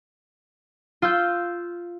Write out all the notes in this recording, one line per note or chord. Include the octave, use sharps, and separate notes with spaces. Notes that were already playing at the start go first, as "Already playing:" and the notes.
F4 E6 G6